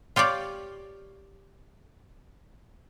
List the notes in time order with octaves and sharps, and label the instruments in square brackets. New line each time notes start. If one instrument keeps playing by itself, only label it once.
[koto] F4 G4 C#5 D5